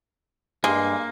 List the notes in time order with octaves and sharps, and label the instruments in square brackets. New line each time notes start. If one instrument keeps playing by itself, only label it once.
[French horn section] G2 [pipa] G#3 [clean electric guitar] A#3